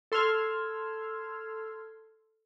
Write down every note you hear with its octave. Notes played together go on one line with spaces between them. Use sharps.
A4 C6 E6 F6 G#6